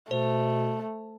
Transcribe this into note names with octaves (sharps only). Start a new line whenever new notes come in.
B2 A3 C5